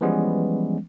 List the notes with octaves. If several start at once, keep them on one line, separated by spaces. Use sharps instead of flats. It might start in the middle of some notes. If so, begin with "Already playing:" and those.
E3 F3 G3 G#3 B3 C#4